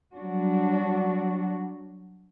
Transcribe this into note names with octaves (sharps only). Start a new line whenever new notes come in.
F#3 G3 D4 F#4